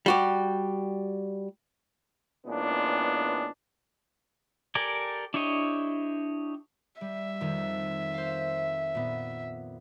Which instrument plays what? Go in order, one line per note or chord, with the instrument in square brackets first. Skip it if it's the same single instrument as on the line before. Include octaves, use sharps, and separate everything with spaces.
[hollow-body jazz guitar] G3 F#4 G4
[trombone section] A#2 E3 G#3 B3 C#4 D4
[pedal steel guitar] G4 A4 A#4 D5 G#5
D4 E4 G4 C#5 D#5
[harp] G3 [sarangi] E5
[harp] F2 D#3
C5 F5
A#2 B3